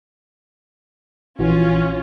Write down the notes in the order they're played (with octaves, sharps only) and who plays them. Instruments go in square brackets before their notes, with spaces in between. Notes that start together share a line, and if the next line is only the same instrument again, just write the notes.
[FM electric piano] A#1 E3 F#4 [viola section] C#4 F4